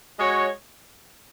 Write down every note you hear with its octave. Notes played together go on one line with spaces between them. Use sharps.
G#3 F#4 C#5